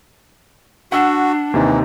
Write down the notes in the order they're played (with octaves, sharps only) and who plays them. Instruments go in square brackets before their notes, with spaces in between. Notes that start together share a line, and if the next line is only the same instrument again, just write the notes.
[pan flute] D4 [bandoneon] F#4 [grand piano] F#5 E6
[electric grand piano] D#2 C3 D#4 [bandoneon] E3